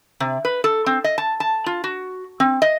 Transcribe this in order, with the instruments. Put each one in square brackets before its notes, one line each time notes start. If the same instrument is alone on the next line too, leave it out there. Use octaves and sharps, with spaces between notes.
[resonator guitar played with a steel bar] C3
B4
A4
C4
D#5
A5
A5
F4
F#4
C4
D#5